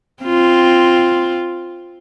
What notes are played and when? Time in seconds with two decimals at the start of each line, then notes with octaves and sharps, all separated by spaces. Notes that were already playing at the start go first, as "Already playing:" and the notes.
0.23 C4 F4